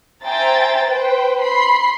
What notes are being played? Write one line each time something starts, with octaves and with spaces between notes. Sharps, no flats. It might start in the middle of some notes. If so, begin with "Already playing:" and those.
C5 E5 G5 G#5 A#5 A6
B4 C5 G5
B5 C6 C7